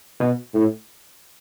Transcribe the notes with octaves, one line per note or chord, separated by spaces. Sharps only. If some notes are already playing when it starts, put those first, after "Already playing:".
B2
A2